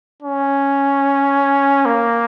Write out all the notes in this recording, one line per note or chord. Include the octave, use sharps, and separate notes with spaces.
C#4
A#3